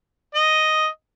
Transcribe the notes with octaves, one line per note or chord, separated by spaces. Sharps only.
D#5